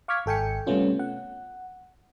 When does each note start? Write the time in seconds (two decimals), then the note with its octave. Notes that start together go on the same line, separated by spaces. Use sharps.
0.08 F5 C#6 D6 F6 G#6 B6
0.26 G#1 A4 G5 G#5 C#7
0.67 C3 G3 A3 B3 C#4 F4
0.99 F#5